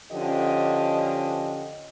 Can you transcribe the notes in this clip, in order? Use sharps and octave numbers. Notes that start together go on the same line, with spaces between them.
D3 F3 C#4 G4 D#5